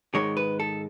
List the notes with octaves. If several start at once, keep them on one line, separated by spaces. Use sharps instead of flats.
G#2 D#3 G#3 C#5
B4
A4